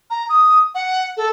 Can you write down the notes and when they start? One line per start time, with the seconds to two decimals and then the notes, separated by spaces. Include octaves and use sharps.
0.10 A#5
0.29 D#6
0.75 F#5
1.17 A4